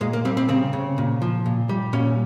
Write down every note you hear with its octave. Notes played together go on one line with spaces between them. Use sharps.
A#2 G#3
A#3
G3 C4
C4
C#3 C4
C#3
A#2
F3
A#2
G3
A#2 C#4